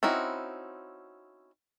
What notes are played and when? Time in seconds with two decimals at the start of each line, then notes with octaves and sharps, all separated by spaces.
0.03 C4 C#4 D#4 E4 F#4